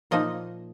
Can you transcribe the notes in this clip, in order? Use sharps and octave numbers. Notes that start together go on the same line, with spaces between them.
A#2 F3 A#3 D#4 D#5